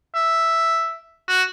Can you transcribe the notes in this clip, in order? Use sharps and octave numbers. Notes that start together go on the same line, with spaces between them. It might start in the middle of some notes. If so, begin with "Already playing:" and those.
E5
F#4